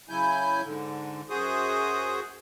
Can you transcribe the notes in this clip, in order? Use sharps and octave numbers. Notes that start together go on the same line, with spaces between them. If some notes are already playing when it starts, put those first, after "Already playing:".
C#3 F#3 E4 G#5 G6
G#2 D3
F#2 F#4 G#4 C5 D#6